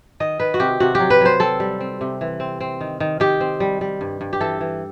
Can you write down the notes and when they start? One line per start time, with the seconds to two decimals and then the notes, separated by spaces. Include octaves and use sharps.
0.20 D#3 D#5
0.40 D#3 B4
0.54 F#4
0.60 C3 G4
0.80 C3 F#4
0.95 F#3 G4
1.10 B4
1.21 F#3 C5
1.40 C4 A4
1.60 G3
1.80 C4
2.01 C3
2.21 E3
2.40 C4
2.61 C4
2.81 D#3
3.00 D#3
3.20 D#3 G4
3.40 C4
3.60 G3
3.81 G3
4.01 G2
4.21 G2
4.33 G4
4.40 E3 A4
4.61 E3